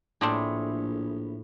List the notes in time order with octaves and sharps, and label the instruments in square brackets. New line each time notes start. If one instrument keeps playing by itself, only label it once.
[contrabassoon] A#1 [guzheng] A2 [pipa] C4 D4 G#4